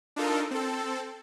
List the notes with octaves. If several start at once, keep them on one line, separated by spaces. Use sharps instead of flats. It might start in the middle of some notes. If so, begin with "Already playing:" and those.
D4 D#4 F4 A4 A#4
C4 A4